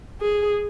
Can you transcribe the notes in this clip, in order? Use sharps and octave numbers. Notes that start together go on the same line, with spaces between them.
G#4